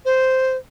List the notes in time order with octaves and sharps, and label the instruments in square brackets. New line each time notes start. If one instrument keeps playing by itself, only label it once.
[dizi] C5